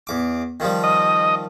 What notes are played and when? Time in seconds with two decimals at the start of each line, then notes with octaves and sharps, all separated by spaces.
0.07 E2 D6
0.60 D#3 F3 G3
0.84 D#5